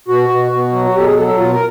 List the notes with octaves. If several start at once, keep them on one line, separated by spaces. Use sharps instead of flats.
B2 F#4
B2
B2
F#3
F#4
B2 G4
A4
G#4
F#3 A4
A4
B2 F4
A#4